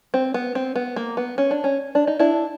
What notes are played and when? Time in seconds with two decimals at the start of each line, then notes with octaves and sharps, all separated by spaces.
0.14 C4
0.34 B3
0.55 C4
0.76 B3
0.96 A#3
1.17 B3
1.38 C#4
1.51 D4
1.64 C#4
1.95 D4
2.07 D#4
2.19 D4 E4